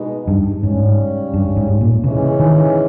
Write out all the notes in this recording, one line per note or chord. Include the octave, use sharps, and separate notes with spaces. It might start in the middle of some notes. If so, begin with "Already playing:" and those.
Already playing: B2 G#3 B3 D#4
G2
G#2 C#3 G3 C#4
G2
G#2
A#2
C#3 E3 G#3 C#4 G#4
D#3